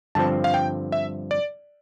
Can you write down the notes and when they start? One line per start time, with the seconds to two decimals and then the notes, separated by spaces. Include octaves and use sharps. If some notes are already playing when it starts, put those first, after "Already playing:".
0.15 G2 D3 F3 C4 A5
0.44 F5
0.54 G5
0.92 E5
1.31 D5